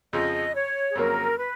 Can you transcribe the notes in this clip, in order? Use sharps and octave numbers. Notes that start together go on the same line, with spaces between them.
F2 C#3 F3 D#5
C#5
G#4
F2 C#3 F#3 A#3 C#4 A#4
B4